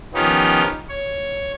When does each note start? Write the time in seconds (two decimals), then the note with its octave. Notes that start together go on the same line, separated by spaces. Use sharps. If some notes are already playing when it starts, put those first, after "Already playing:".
0.14 D#3 F3 B3 C#4 D#4 G4
0.89 C#5